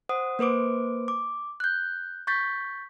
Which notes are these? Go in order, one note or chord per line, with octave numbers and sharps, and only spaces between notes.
C5 F#5 D#6
A#3 B4 C5 D6 D7
D6
F#6 G6
C#6 G6 A6 B6